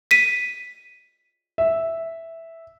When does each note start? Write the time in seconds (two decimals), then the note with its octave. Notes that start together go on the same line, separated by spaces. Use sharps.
0.11 B6 D#7
1.58 E5